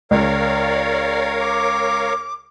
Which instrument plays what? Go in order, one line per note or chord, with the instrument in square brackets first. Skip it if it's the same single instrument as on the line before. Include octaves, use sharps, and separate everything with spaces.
[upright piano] C#2 [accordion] A#4 C#5 F5 [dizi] D5
[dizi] D6